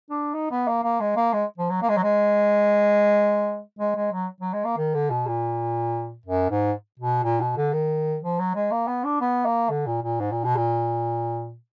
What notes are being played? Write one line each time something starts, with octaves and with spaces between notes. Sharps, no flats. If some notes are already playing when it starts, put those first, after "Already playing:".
D4
D#4
B3
A#3
A#3
G#3
A#3
G#3
F3
F#3
A#3
G#3
F#3
G#3
G#3
G#3
F#3
F#3
G#3
A#3
D#3
D3
B2
A#2
F#2
G#2
B2
A#2
B2
D3
D#3
F3
F#3
G#3
A#3
B3
D4
B3
A#3
D3
A#2
A#2
G#2
A#2
B2
A#2